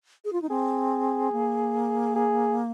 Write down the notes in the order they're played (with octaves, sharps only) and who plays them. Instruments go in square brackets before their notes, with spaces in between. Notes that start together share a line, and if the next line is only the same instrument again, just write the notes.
[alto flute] G#4
F4
D#4
[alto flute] C4 [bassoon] G#4
[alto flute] A#3
[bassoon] G#4